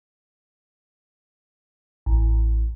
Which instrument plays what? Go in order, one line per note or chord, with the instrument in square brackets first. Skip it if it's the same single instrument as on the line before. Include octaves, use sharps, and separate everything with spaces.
[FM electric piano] A1